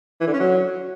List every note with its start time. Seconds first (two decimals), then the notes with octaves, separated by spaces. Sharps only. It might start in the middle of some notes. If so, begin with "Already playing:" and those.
0.21 E3
0.27 D3
0.33 C#4
0.40 F#3